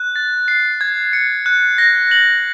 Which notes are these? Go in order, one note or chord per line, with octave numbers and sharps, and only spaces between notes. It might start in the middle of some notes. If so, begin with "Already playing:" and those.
Already playing: F#6
A6
C7
G#6
C#7
F#6
A#6
F#7